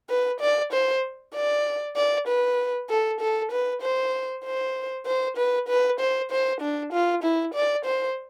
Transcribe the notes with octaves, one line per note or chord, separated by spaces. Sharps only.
B4
D5
C5
D5
D5
B4
A4
A4
B4
C5
C5
C5
B4
B4
C5
C5
D4
F4
E4
D5
C5